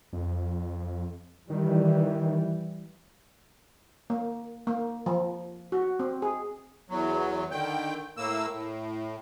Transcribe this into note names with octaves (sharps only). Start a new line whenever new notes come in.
F2
D#3 E3 G3
A#3
A#3
F3
F#4
C4
G#4
E2 F#3
D3 D#3 G5
A2 A#3 E6
A2